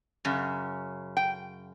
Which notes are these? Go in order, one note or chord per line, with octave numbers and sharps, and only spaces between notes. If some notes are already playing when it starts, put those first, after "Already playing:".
F#2 C#3
G5